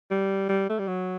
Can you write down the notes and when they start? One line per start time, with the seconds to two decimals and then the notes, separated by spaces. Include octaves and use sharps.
0.11 G3
0.49 G3
0.69 A3
0.79 G3
0.88 F#3